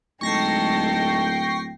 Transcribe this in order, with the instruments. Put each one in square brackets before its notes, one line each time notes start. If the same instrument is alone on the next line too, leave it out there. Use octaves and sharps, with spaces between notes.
[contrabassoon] D1 [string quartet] G#3 D#4 A4 [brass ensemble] G5 [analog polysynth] C#6 A#6 C7